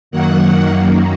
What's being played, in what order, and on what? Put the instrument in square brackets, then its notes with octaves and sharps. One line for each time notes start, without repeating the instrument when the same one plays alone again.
[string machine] F#2 D#3 F#3 A#3 F#5